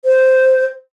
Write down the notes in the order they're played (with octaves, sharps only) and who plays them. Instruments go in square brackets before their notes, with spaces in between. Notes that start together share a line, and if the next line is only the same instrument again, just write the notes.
[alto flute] C5